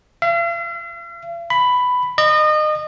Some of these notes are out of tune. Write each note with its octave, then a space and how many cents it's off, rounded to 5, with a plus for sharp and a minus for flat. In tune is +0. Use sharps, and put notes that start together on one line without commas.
F5 -45
B5 +10
D#5 -30